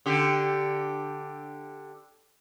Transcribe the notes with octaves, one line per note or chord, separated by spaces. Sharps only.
D3 G4